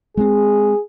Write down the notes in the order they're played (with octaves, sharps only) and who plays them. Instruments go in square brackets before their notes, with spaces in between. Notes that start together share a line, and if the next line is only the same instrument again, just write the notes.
[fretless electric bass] G#3 A#3 C4 [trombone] G#4